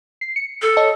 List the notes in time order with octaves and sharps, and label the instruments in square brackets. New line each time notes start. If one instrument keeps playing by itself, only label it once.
[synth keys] C7
C#7
[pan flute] A4
[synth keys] C#5 D#5 A5